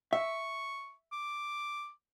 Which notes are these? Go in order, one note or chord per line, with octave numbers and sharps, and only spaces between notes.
E5 C#6
D6